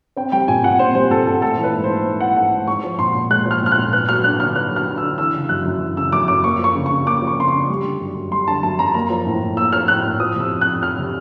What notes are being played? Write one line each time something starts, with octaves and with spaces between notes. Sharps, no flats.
C4 G5
G3 G5
A#2 G#5
A#2 F#5
C4 C5
G3 C5
A#2 A4
A#2 A4
A3 A4
E3
B4
G#2
C5
G#2
A3
E3 F#5
G#2 F#5
G#2
G#3 C#6
F3
A#2 C6
A#2
G#3 F#6
F3
F6
A#2 F6
F#6
A#2
B3 F#6
F#3 F6
D4 F#6
D3 F6
B3 F#6
F#3
F6
D4
D3 E6
E3 E6
C#3
F#2 F#6
F#2
E3
C#3 E6
F#2 D6
F#2 D6
A#3 C#6
F3
C#6
C#3
C#3 C#6
A#3 D6
F3
C#6
C#3 C6
C#6
C#3
G3
D3
F#2
F#2
G3 C6
D3 A5
F#2 A5
F#2 A#5
A#3 A#5
F3
A2
A2
A#3 E6
F3 F6
A2 F#6
A2
F3 D#6
C3 E6
F2
F#6
F2
F3 F6
C3